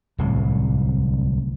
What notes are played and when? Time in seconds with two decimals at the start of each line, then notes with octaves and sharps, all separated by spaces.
0.18 D1 C2 A2 C3